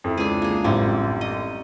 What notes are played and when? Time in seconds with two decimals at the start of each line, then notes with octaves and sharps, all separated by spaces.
0.04 F2 E4
0.17 C#2 D4 G#4
0.42 A#3 G#4
0.64 A1 F#2 G3 C4
1.21 D#5